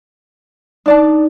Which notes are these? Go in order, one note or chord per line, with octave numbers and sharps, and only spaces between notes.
D4 D#4 D5 A5